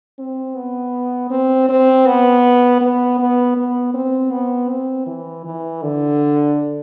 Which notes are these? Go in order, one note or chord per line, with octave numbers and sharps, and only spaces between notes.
C4
B3
C4
C4
B3
B3
B3
B3
C4
B3
C4
E3
E3
D3